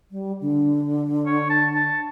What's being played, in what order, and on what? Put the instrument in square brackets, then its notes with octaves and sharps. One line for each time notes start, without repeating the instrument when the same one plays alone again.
[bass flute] G3
D3
[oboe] C#5
A5
A5